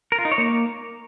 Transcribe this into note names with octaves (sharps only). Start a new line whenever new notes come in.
A#4
F4
D#4
C#5
A#3